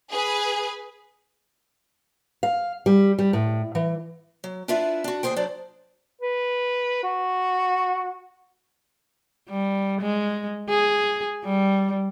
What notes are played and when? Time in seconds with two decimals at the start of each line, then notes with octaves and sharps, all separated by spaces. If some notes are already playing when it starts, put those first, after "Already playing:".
0.12 G#4 B4 G#5
2.43 F5
2.86 G3
3.19 G3
3.33 A2
3.75 E3
4.44 F#3
4.68 D4 E4 F4 B4 E5
5.04 D4 F#4
5.23 D#2 F3 G#4 C5 G5
5.36 F#3 D4 C5 D5
6.21 B4
7.03 F#4
9.50 G3
10.01 G#3
10.69 G#4
11.45 G3